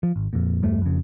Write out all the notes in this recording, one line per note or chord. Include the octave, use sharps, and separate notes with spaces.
F3
G#1
F2 A#2
E2 G2 A3
F2 C#3